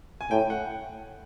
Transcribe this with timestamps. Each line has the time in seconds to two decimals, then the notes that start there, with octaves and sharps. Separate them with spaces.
0.21 G#5
0.31 A2 G5
0.50 F#5